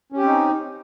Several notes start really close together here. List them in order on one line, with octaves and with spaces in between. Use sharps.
C#4 G4 C4 D#4